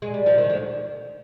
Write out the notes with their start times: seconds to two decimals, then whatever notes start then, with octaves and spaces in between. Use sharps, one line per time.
0.02 G#3
0.14 G3
0.26 F3
0.38 D#3
0.50 D2 D3